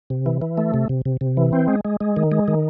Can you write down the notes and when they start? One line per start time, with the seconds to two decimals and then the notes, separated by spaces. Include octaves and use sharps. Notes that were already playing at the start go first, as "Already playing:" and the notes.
0.10 C3
0.26 E3
0.42 E3
0.58 A3
0.74 C3
0.89 C3
1.05 C3
1.21 C3
1.37 E3
1.53 C4
1.68 G#3
1.85 G#3
2.00 G#3
2.16 D#3
2.32 G#3
2.48 D#3